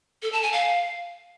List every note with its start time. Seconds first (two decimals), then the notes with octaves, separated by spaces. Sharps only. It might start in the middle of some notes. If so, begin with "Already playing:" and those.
0.22 A4
0.32 A5
0.43 G#5
0.53 F5